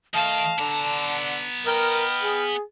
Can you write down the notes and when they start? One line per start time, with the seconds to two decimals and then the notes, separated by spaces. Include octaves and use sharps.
0.14 D#3 A3 D#5 F5 A5
0.59 D3 B3 A#5
1.66 A#4 B4 D#5 G5 F6
2.22 G#4